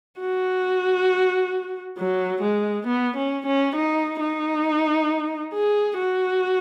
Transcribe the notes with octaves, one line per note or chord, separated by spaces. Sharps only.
F#4
F#3
G#3
B3
C#4
C#4
D#4
D#4
G#4
F#4